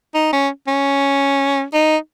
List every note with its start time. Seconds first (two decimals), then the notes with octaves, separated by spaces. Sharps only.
0.15 D#4
0.33 C#4
0.68 C#4
1.74 D#4